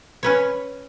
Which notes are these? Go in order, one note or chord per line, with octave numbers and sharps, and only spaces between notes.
C#4 B4 C#5